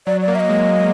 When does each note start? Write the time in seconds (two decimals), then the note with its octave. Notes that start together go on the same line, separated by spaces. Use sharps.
0.07 F#3 D5
0.21 D5
0.28 A#3
0.35 E5
0.40 D#5
0.49 G#3